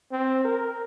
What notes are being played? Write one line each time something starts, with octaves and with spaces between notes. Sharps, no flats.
C4
A#4